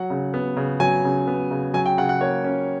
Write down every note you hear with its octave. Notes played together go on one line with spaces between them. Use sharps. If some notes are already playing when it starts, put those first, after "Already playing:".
Already playing: F#3 F#5
C#3
B3
C#3
F#3 G#5
C#3
B3
C#3
F#3 G#5
G5
C#3 F#5
F#5
A#3 C#5
C#4